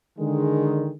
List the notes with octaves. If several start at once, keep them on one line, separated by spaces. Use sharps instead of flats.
D3 D#3 G#3